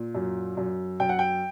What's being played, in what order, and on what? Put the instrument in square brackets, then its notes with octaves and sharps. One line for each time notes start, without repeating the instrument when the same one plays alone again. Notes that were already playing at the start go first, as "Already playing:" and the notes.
Already playing: [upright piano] A#2
F#2
F#2
F#2 G5
F#5
G5